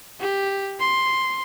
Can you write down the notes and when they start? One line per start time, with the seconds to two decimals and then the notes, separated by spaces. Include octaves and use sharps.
0.20 G4
0.80 C6